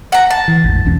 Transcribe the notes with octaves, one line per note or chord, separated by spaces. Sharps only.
F#5 A#5
A5
E3
A1 E2 G#2
B1 E2 C#4